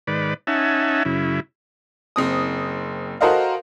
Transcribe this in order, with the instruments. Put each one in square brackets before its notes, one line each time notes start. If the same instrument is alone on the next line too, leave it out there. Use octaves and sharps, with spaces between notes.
[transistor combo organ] G#2 D#3 B4 D5
C#4 D#4 E5 F#5 G#5 A5
F#2 C#3 E4
[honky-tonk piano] F#1 C4 D#6
F#4 A4 A#4 C5 D#5 F5